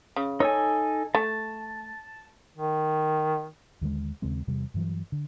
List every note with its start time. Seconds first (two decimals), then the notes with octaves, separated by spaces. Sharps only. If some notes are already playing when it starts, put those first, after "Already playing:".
0.16 C#3
0.40 D#4 A4 C#5 G#5
1.15 A3 A5
2.58 D#3
3.81 D#2 D3 F3 G#3
4.22 D#2 C#3 G#3 C4
4.47 E2 C3 G3
4.74 G2 E3 F#3
5.12 D3